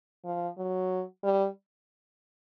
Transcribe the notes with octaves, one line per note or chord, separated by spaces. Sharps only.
F3
F#3
G3